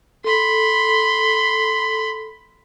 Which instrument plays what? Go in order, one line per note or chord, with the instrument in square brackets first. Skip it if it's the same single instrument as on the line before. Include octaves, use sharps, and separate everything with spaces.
[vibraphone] A4 [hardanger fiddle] B5 C6